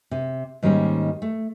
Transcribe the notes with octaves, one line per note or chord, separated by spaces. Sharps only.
C3
G#2 D#3 G3 A#3 C#4
A3